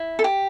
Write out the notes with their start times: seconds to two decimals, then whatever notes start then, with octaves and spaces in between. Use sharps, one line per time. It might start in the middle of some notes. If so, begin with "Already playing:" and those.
Already playing: E4
0.19 A4
0.24 G4